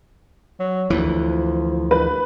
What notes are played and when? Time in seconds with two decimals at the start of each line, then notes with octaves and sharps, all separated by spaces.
0.60 F#3
0.90 D2 E3 F3
1.91 B4